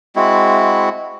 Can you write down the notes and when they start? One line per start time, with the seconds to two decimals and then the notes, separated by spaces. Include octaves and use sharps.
0.16 G#3 C4 E4 F#4